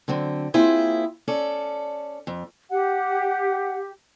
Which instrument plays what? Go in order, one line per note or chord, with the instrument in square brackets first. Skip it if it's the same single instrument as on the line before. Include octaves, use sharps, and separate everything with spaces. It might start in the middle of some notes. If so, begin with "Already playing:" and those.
[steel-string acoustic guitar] D3 F#3 C4
A#3 C4 E4 F4 G#4 C5
C#4 A4 D5
F2
[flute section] G4 [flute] F#5